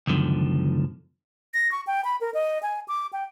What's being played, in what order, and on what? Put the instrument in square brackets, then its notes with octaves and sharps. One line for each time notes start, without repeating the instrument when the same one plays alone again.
[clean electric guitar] C#2 F#2 B2 D3 D#3 F3
[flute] A#6
C#6
G5
B5
A#4
D#5
G#5
D6
G5